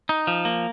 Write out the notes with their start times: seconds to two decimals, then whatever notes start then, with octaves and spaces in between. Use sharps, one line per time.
0.09 D#4
0.27 F3
0.45 A#3